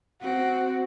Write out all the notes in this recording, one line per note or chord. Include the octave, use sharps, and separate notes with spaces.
C4 F#4